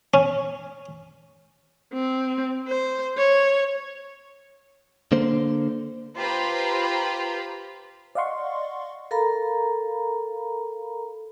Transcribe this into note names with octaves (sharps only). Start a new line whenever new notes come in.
C#4
C4
C5
C#5
D3 A#3 C5
F4 G4 B4 C5 A#5 B5
D5 D#5 F5 F#5 C6 C#6
A4 A#4 F5 A#5 B5